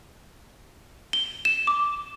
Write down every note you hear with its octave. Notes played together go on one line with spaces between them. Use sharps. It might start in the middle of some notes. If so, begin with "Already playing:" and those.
G7
E7
D6